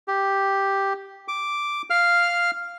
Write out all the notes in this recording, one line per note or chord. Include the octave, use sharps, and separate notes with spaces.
G4
D6
F5 F6